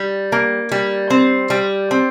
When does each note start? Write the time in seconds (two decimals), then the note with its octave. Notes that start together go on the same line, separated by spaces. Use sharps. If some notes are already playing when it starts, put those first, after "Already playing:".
Already playing: G3
0.32 A#3
0.72 G3
1.10 C4
1.50 G3
1.91 C4